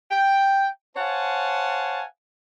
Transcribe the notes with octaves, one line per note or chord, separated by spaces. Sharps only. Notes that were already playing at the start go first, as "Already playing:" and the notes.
G5
C5 C#5 F5 F#5 G#5 A5